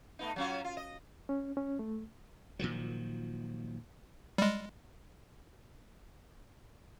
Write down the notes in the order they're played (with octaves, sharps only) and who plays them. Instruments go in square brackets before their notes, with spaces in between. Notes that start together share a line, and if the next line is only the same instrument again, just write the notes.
[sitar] A3 B3 D#4
F#3 C#4 F4
F4
D#5
[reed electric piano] C#4
C#4
A3
[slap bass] A#2 D#3 F3 F#3
[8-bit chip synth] G3 G#3